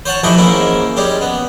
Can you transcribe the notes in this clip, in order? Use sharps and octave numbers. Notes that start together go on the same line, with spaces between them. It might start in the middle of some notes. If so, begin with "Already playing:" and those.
C5 C#5 F#5 A5
F2 E3 A3 E4 G4 D#5
G#2 A#3 C#4 E4
G3 G#3 C#4 G4
B3